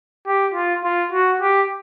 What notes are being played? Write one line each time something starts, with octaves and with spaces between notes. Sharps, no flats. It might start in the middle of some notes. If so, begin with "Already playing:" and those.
G4
F4
F4
F#4
G4